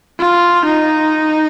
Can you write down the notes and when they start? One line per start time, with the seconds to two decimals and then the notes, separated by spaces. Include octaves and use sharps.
0.19 F4
0.65 D#4